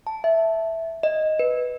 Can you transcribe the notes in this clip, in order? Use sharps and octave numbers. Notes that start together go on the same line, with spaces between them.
A5
E5
D#5
B4